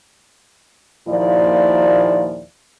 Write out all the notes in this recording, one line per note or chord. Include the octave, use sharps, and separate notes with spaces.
D#2 A#2 F3 E4 D5